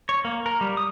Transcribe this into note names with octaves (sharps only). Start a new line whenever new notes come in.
C#5
A#3
A#4
G3
D#6